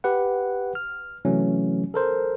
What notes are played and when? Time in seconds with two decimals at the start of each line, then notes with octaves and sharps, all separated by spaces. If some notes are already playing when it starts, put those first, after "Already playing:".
0.04 G4 B4 F#5
0.75 F6
1.25 C3 E3 F#3 A3 C#4
1.94 A4 A#4 C5